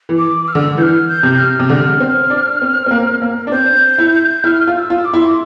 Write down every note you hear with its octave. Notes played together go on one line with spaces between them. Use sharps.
E3
D6
F6
D3 E6
E3 G6
F6
G6
C3
F6
C3
D3 F6 G6
C4
D4
C4
C4
A#3
A#3
D4
C4 G6
E4
E4 F6
F4
F6
E6
F4
D6
E4 C6
D6